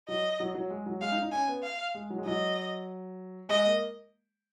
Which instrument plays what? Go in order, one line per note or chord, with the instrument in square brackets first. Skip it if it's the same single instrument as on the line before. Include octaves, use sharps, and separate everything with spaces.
[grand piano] F#3 [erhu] D#5
[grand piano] F#3
F#3
G#3
F#3
[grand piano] G#3 [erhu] F5
[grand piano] D#4
D#4
[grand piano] C#4 [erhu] G#5
[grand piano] B3
[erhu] F5
[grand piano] G#3
F#3
G#3
[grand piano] F#3 [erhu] D#5
[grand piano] G#3 [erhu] D#5
[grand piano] A#3